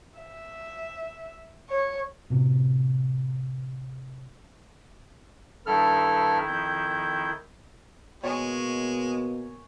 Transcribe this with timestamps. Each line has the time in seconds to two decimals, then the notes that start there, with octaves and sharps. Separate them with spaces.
0.19 E5
1.70 C#5
2.30 A2 C3
5.66 G2 D#3 E4 A4 F6
6.48 F2 G6
8.24 B2 G#3 A#3 C#5 G#5